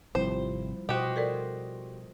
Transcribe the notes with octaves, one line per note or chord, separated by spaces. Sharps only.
G#1 C3 F3 G3 C4 E4 C5
B2 F#4 G4 C5 D#5
A4 A#4 D5